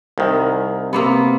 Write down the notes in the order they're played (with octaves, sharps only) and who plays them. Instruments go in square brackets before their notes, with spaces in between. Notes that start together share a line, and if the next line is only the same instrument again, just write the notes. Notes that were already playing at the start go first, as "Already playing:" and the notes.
[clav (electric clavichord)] C2 D#3
[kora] C3 A#3 B3